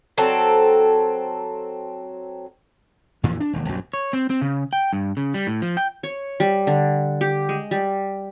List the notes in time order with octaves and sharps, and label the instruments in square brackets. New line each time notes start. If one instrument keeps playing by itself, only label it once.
[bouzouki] F#3 C4 A4
[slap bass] F2 A#2 E3 F3
D4
E1 D#2
A#1 F#2 F#3
[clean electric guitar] C#5
C4
C4
C#3
G5
G2
C#3
G3
A2
F3
G5
[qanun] C#5
G3
D3
G4
G#3
G3